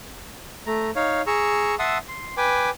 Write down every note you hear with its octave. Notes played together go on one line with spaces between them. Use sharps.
A3 A#5
D#4 C#5 F5
G#4 A#5 C#6 E6
E5 F#5 A5 C6 D#6 E6
C6
B4 G5 G#5 D6